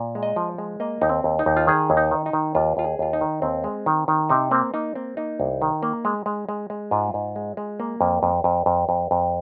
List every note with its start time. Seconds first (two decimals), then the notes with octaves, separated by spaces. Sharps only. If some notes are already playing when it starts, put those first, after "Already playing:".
Already playing: A#2
0.15 G#3
0.23 D#5
0.36 F3
0.58 G#3
0.80 A#3 D#5
1.02 D#2 D#4
1.09 C4
1.24 D#2
1.39 D#4
1.46 D#2
1.57 F4
1.67 D#3 G#4
1.90 D#2
1.97 D#4
2.11 D#3
2.26 D#4
2.33 D#3
2.55 D#2 F4
2.77 D#2 F4
2.84 G#4
2.99 D#2 F4
3.13 D#4
3.21 D#3
3.42 D#2 C4
3.64 G#3
3.86 D#3
4.08 D#3
4.29 C3 D#4
4.51 A#3 C4
4.74 A#3 D#4
4.95 A#3 C4
5.17 A#3 D#4
5.40 C2
5.62 D#3
5.83 A#3
6.05 G#3
6.26 G#3
6.49 G#3
6.70 G#3
6.91 G#2 F4
7.14 G#2
7.36 G#3
7.57 G#3
7.80 A#3
8.01 F2
8.23 F2
8.44 F2
8.66 F2
8.89 F2
9.11 F2